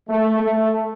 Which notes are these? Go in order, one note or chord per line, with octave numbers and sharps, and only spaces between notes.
A3
A3